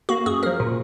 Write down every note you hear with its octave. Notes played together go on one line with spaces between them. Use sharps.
A#3 F#4
F#2 G#4
F3 A#3 A#4
A#2